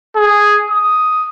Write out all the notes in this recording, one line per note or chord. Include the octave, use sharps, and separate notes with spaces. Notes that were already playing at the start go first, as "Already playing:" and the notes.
G#4
D#6